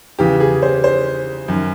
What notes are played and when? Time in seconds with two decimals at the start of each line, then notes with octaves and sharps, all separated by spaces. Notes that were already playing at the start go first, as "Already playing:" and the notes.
0.19 E2 C#3 E3 G4
0.40 G#4
0.62 C5
0.84 C5
1.48 F#2 D#3